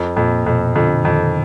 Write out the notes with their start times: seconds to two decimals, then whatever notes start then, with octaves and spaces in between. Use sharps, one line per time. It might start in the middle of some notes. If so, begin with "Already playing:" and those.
Already playing: F2
0.17 F2 A#2
0.46 F2 B2
0.75 F2 D3
1.04 F2 D#3